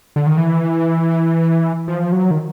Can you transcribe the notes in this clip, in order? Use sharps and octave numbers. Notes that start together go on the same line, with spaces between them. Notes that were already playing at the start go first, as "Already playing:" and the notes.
D3
D#3
E3
F3
F#3
D#3